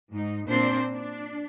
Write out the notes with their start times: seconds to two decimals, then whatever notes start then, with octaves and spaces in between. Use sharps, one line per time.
0.13 G#2 D#4
0.48 A#2 A#3 C4 D4 C5
0.94 D4